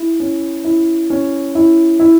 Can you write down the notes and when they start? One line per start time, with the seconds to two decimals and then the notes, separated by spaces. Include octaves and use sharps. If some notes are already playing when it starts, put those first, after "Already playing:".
Already playing: E4
0.20 C#4
0.64 E4
1.10 C#4
1.55 E4
2.00 E4